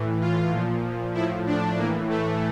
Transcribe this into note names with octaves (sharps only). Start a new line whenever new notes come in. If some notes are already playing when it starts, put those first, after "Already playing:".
Already playing: A2 E3
F4
A#2 F3
A2 F3 E4
D4
A2 E3 A#3
A3